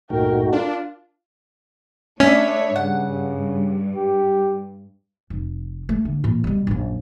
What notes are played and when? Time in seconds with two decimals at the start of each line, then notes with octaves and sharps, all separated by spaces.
0.10 C#2 G2 A#2 A3 D#4 F#4 A#4 G5
0.52 D4 F4 A#4
2.20 A3 C#4 D4 B4 C#5 D#5 E5
2.76 G2 C#3 F#5
3.96 G4
5.30 F1
5.89 A3
6.05 D3
6.24 A#2 E3
6.44 B2 G3
6.67 A#1 F#2